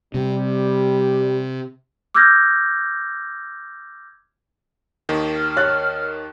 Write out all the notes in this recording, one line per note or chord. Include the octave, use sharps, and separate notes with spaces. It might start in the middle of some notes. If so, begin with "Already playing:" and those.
C3 G3
D6 E6 F6 G6 G#6 A#6
D#2 D#3
F6
C#5 F#6 A6